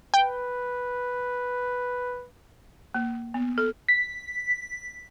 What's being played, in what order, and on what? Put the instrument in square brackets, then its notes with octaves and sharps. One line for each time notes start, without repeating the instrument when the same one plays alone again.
[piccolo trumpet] B4 [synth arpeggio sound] G5
[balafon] A#3
B3
A4
[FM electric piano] B6